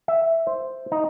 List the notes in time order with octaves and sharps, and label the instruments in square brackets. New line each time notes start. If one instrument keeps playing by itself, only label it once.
[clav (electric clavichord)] E5
C5
D#4